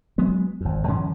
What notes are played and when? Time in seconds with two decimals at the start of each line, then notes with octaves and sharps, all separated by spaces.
0.18 F#3 G#3 B3
0.61 G#1 F2
0.88 F#2 D3 E3 C#4